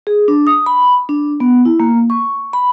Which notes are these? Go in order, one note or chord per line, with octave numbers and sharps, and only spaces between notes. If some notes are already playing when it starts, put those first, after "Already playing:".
G#4
D4
D#6
B5
D4
B3
E4
A#3
C#6
B5